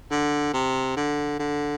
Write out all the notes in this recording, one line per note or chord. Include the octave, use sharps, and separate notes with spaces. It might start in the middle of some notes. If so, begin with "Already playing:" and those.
D3
C3
D3
D3